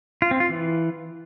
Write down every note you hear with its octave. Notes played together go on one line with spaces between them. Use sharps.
F4
C4
F4
E3